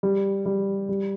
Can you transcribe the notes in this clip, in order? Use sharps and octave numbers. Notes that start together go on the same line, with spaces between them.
G3
G3
G3